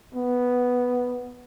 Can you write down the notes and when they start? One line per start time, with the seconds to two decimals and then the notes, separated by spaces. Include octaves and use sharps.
0.14 B3